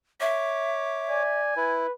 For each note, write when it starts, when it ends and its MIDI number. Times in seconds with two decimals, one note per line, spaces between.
0.21 1.23 73
0.21 1.41 76
0.21 1.23 86
1.09 1.52 74
1.09 1.78 80
1.57 1.87 64
1.57 1.92 71